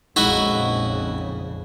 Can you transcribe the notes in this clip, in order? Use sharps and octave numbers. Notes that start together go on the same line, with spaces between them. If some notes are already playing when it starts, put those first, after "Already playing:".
A#1 F2 C#3 G#3 D#4 E4 F#4 D#5